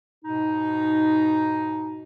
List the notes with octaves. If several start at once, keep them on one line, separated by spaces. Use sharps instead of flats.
G#2 B2 D#4